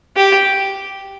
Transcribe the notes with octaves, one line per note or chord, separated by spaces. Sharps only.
G4